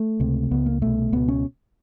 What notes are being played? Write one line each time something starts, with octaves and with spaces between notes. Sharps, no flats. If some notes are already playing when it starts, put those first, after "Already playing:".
Already playing: A3
C#2 C3
C#2 C#3 B3
A#3
C2 B2 A3
C#2 B2 B3
C#4